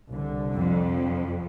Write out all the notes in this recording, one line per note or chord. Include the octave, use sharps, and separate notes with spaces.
C2 D3
F2